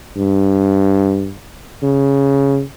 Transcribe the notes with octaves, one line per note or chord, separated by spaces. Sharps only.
G2
C#3